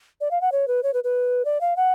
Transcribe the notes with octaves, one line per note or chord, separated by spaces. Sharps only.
D5
F5
F#5
C#5
B4
C#5
B4
B4
D5
F5
F#5